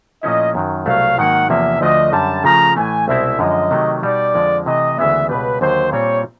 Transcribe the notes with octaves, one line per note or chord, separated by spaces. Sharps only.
A#2 F3 A3 C#4 E4 D#5
F#2 D#3 F#3
C2 B2 F#3 A3 F5
G#2 D#3 F#3 A#3 F#5
E2 C3 F3 A#3 C#4 E5
D2 D3 F3 A3 D4 D#5
F#2 D3 G3 A5
C#3 F3 A3 A#5
A2 E3 A3 G#5
C2 B2 G#3 C4 E4 E5
F#2 D3 F3 G#3 D#5
C3 D#3 F#3 A3
B2 G3 B3 D#4 D5
F2 D3 F3 G#3
C3 E3 A3 D#5
D2 C#3 E3 G#3 B3 E5
C#2 B2 G3 B4
D#2 D3 F#3 C5
A#2 G3 C4 C#5